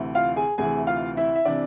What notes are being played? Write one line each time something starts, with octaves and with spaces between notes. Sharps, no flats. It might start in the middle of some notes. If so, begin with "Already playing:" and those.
Already playing: D2 C3 E3
F4 F5
G#4 G#5
D2 C3 E3 G#4 G#5
F4 F5
E4 E5
E5
C3 E3 D4 D5